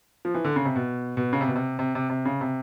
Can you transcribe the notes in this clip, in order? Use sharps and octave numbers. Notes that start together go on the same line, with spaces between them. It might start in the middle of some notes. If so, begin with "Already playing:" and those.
F3
E3
D3
C#3
C3
B2
B2
C#3
C3
B2
C3
C3
C3
C3
C#3
C3